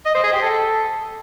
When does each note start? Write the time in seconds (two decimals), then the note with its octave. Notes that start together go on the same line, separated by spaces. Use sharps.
0.06 D#5
0.15 C5
0.24 G#4
0.33 G4
0.42 A4